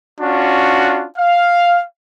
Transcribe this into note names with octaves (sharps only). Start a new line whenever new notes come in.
C#4 D4 F4 F#4
F5